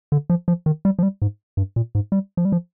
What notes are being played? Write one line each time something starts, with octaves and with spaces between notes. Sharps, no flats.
D3
F3
F3
D#3
G3
F3
G3
G#2
G2
A#2
G#2
G3
F3
G3
F3